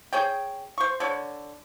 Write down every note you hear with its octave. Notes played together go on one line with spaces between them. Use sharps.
G#4 C#5 G5
C5 C#6
D3 C#5